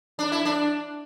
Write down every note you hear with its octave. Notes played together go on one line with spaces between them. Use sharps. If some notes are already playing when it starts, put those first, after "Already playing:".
D4
E4
D4